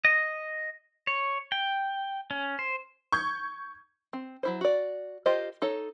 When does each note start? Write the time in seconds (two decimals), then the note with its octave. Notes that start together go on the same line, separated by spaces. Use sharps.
0.05 D#5
1.07 C#5
1.52 G5
2.31 C#4
2.59 C5
3.12 C#6 G6 G#6
4.13 C4
4.43 F#3 E4 C5
4.61 F#4 D5
5.26 F4 G4 A#4 C5 D#5
5.62 D#4 A4 C#5